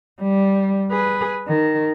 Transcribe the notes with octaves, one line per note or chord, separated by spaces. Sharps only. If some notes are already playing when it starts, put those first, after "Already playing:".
G3
G#4 B4
D#3